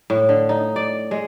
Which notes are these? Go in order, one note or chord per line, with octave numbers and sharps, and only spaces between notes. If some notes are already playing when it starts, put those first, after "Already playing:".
A2
D3
D#4
D5
G#3